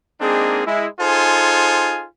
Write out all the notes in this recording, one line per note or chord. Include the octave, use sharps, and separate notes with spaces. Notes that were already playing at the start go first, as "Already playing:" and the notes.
G#3 A#3 C4 D4 D#4 G#4
G#3 E4
D#4 F4 G#4 A4 C5 G#5